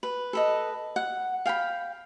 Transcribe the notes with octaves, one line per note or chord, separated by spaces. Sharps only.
B4
A4 B4 D#5
F#5
F5 G5 G#5 B5